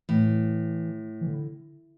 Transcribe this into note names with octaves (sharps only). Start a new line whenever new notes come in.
A2 E3
E3
D3